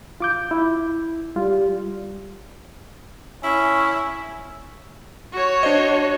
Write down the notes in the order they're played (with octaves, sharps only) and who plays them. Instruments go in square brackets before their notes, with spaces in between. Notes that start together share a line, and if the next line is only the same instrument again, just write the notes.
[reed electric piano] F4 D6 G6
E4
[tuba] G3 [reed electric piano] F4
[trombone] C#4 [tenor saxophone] E4
[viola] F#4 C#5
[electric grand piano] D4 C5 D#5